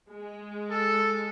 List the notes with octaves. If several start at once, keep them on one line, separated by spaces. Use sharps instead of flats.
G#3
A4